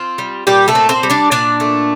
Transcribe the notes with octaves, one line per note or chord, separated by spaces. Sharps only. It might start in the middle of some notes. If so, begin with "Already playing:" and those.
Already playing: C4 F4
G3
A#2 G3 G4
A3 A4
C4
C4 C5
G3
D4 D5
A#2 D4 D5
A3